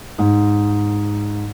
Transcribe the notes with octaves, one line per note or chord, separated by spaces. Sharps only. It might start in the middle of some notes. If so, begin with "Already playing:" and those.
G#2